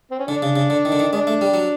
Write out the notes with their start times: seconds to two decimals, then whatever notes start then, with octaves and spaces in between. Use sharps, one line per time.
0.11 C4
0.19 C#4
0.27 D3 D4
0.42 C#3
0.56 C#3
0.70 D3
0.85 D#3
0.92 D3
0.99 D#3
1.13 G#3 D4
1.27 A3
1.41 G3
1.54 F#3